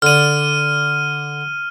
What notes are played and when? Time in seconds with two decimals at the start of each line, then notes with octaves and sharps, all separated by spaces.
0.02 D3 D5 F6 D#7